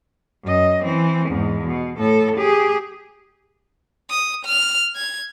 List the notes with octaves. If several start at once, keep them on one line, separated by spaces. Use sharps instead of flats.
F#2 D#5
E3 C4
E2 G#2
B2
A2 A4
G4 G#4
D#6
F6
G#6